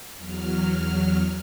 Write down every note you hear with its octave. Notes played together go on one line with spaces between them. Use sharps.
E2 F#3 F6